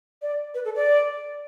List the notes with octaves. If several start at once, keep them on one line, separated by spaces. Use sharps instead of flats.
D5
B4
A4
D5